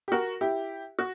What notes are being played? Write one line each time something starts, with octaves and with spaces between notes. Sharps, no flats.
G4
F#4 A#4
E4 G4
F#4